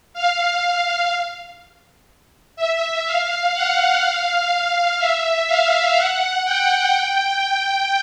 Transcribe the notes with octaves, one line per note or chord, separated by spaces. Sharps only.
F5
F5
E5
F5
F#5
F5
E5
F5
F#5
G5
G5